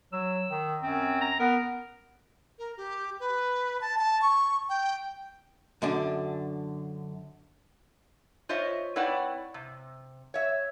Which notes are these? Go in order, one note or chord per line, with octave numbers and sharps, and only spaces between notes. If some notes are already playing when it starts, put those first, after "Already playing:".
F#3 E6
D#3
F#2 C4
A#5
B3 A#4
A#4
G4
B4
A5
A5
C#6
G5
F#2 D3 D4
F4 C5 C#5 D#5 E5
C4 E4 B4 C#5 D5 F#5
C3
C#5 E5